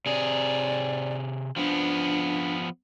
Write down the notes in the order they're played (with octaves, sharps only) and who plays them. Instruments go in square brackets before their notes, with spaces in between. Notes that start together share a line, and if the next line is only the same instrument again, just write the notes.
[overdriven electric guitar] C3 G#4 [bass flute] D5
[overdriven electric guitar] F3 B3 [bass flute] D4